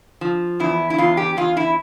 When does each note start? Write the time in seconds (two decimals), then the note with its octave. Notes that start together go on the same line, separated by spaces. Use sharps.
0.21 F3
0.60 E2 E4
0.90 E4
0.98 E2 F4
1.17 G4
1.37 E2 F4
1.57 E4